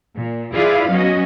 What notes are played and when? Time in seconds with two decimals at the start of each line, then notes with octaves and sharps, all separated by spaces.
0.15 A#2
0.54 E4 F4 G#4 B4 D5 F5
0.89 F#3 B3 C#4 F#4 D#5